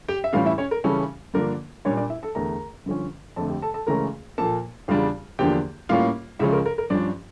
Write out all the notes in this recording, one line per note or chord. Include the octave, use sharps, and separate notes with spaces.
G4 G5
E5
A2 E3 G3 C#4 F4 F5
E4 E5
C#4 C#5
A#4
C#3 E3 G3 C#4 A4
G2 D3 F3 A#3 D4 A#4
A#2 G3 A#3 C#4 D4 C#5
D4 D5
E4 E5
A4 A5
E2 D3 A3 A#4 A#5
G2 D3 F3 C#4
F2 D3 A3 A4 A5
G4 G5
A4 A5
A4 A5
C#2 C#3 E3 A3 C#4 A#4 A#5
A#2 F3 A#3 A4 A5
E2 C#3 G3 D4 F4 F5
E2 D3 F3 A#3 D4 G4 G5
A2 G3 A#3 C#4 F4 F5
C#2 C#3 F3 C#4 E4 E5
A#4
A#4
A#4
G2 F3 C#4 D4 D5